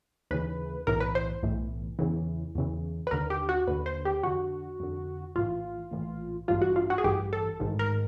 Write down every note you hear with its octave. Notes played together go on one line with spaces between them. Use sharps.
D#2 C#3 E3 B4
B1 A2 E3 A#4
B4
C5
B1 A2 E3
E2 C#3 E3
E2 C#3 E3
B4
D#2 D3 A#4
G4
F#4
D#2 D3 B4
C5
G4
F2 D3 F#4
F2 D3
A#1 A2 E3 F4
A#1 A2 E3
A1 G2 E3 F4
F#4
F4
F#4
G#4
A1 G2 E3 G4
A4
A1 G#2 D#3
A#4